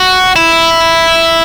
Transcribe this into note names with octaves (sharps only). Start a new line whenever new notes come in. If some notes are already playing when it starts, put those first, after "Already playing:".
Already playing: F#4
E4